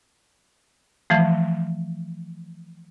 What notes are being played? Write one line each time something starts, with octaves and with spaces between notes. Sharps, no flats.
E3 F3 A3